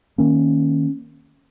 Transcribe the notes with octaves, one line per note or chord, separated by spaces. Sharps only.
D#3 A#3 C#4